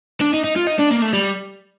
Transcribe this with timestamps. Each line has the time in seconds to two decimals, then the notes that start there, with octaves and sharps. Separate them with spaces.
0.21 D4
0.34 D#4
0.44 D#4
0.56 F4
0.67 D#4
0.79 D4
0.91 A#3
1.02 A3
1.13 G3